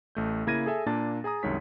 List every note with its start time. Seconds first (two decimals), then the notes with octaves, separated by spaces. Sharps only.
0.15 A1 A3 G6
0.47 C#3 A#3 E4 G#6 A#6 D#7
0.66 G#4 A4 E5 G#5
0.86 A#2 A#3 D4 A5 A6
1.24 G#4 G#5 A#5 D#6
1.43 C2 F#2 D#3 G#3 C#5 B6